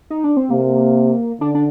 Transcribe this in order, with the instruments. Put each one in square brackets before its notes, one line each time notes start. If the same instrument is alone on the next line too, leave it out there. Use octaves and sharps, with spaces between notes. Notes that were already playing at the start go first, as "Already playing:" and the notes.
[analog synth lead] D#4
D4
C4
[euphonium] C3 [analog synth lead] A#3
[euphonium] D3 [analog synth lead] D4
[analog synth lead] D4